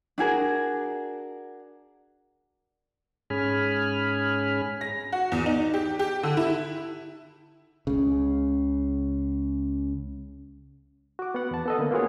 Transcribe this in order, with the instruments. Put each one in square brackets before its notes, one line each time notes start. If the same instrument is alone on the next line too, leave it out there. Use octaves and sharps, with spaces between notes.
[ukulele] D4 F#4 G#4 A#4
[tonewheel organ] G#2 C#4 G#4 G#5 B5 F6
[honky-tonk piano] A#6
F#4
E2
D#4
G4
G4
D3
E4
[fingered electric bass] C#2 C#3
[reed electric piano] F#4 D6
B3 F#5
E2 A5
B3 A4 D#5
D3 A#3
A#3 B3 F4 F#4 G#4 C#5